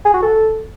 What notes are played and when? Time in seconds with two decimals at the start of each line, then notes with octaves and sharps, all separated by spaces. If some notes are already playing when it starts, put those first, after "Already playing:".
0.05 G#4
0.14 F#4
0.22 A4